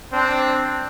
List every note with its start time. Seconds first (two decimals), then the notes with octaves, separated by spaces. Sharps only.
0.12 C4 D4